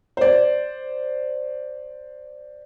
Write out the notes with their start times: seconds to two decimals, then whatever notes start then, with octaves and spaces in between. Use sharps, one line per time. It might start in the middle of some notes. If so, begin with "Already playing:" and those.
0.17 C5 D5